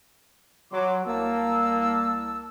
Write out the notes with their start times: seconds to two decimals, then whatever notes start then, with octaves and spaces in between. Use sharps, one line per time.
0.72 F#3 C6 D6
1.06 C2 A#3 A5 E6